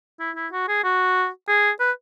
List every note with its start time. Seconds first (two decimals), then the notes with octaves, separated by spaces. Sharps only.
0.20 E4
0.36 E4
0.52 F#4
0.68 G#4
0.84 F#4
1.48 G#4
1.80 B4